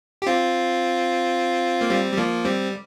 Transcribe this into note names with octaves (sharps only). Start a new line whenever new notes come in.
G4
C4 F4
A#3
G3 C4
G3
F3 A#3
G3 C4